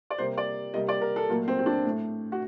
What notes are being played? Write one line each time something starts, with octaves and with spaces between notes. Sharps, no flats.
D5
C3 G3 A#3 C5
D5
C3 G3 A#3 D#5
D5
A#4
A4
A#2 F#3 A3 A#3
C4
C4
D4
A2 A3
F#4